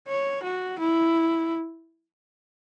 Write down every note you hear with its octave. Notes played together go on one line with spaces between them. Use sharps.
C#5
F#4
E4